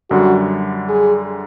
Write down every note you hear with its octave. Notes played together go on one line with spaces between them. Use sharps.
F#2 D3 G3 F#4
G#4